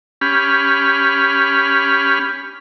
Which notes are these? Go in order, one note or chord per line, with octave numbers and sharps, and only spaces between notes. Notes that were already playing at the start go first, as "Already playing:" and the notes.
C#4 G4 B5 F6